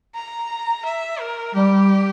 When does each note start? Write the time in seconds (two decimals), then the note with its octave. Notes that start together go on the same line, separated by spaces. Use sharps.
0.15 A#5
0.85 E5
1.20 A#4
1.55 G3 G4